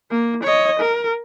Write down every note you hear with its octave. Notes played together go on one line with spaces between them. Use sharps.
A#3
C#5 D#5
A#4